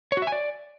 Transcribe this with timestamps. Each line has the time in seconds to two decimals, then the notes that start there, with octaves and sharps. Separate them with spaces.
0.12 C#5
0.17 F#4
0.22 E5
0.27 G#5
0.32 D5